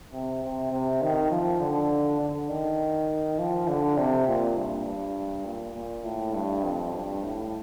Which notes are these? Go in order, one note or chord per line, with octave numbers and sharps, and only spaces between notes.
C3
C3
C3
D#3
F3
D3
D3
D#3
F3
D3
C3
A#2
G2
G2
A#2
A#2
A2
G2
F2
G2
A2